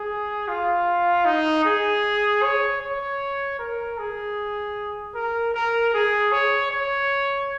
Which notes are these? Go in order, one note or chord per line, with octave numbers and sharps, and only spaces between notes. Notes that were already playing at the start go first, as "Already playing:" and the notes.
Already playing: G#4
F4
D#4
G#4
C#5
C#5
A#4
G#4
A#4
A#4
G#4
C#5
C#5